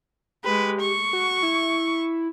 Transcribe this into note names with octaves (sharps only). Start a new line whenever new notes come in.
G#3 G4 B4
C#6
F#4
E4